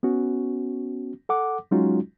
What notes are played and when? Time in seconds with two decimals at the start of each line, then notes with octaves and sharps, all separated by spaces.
0.03 B3 C#4 F#4
1.29 A4 F#5 D6
1.71 F#3 G#3 C#4 D#4 F4 F#4